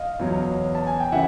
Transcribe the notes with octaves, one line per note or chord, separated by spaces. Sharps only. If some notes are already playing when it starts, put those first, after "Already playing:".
Already playing: D#5 F5
E2 B2 F#3
A5
G#5
G5
C#3 E3 E5 F#5